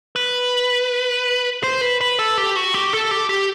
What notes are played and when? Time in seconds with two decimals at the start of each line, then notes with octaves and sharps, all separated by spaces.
0.16 B4
1.63 C5
1.81 B4
2.01 B4
2.19 A4
2.38 G4
2.56 F#4
2.74 G4
2.93 A4
3.11 G4
3.29 G4